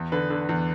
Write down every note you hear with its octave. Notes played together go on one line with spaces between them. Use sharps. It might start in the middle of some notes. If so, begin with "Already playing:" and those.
Already playing: E2
D3 B4
D3
E2